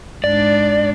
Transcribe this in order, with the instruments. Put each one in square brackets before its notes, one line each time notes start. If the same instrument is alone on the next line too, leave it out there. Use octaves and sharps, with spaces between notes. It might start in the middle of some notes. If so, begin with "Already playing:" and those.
[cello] G#2 D4 [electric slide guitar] D5